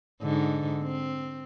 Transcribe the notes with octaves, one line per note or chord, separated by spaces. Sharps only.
G#2 D3 D#4
C4